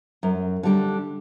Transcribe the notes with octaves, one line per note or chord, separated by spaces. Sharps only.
F#2
D3 G3 D4